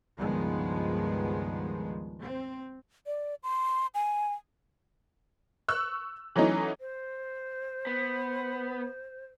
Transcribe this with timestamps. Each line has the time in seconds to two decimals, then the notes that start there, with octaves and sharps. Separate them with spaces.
0.20 C#2 G2 D#3 F3 G#3 B3
2.22 C4
3.06 D5
3.43 C6
3.94 G#5
5.68 C#6 E6 F#6
6.36 E3 F#3 A3 C#4 D#4 E4
6.80 C5
7.87 B3